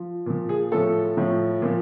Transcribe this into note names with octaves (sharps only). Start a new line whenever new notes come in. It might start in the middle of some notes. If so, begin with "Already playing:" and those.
Already playing: F3
A#2 F3
G#4
A2 F3 A4
A2 F3
A#2 F3